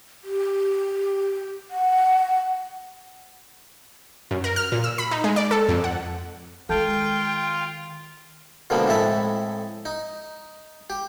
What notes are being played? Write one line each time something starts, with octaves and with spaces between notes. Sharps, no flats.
G4
F#5
F#2
A#4
F6
A#2
E6
B5
D#4
G#3
D5
A4
F2
F#5
D#3 G#3 F4 A4 G5 A5 G6
B2 D3 D#3 F3 G#3 A#3
F2 A2 G#3 E4 E5 A5
D#4
G4